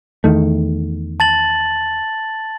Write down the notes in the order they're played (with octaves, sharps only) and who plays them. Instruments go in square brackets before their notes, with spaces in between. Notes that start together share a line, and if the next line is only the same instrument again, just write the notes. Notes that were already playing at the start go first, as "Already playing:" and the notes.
[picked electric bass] E2 D#3 A3
[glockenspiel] A5 A6 F#7